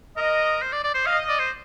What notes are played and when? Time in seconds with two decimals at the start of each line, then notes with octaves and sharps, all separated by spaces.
0.17 A#4 D#5
0.62 C5
0.72 D5
0.84 D5
0.94 C5
1.06 D#5 F5
1.28 D5
1.39 C5